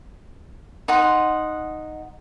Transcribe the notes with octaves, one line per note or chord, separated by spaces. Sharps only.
D#4 F#5 C6